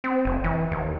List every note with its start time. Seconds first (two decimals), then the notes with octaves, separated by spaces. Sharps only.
0.04 C4
0.25 F1
0.44 E3
0.72 D#2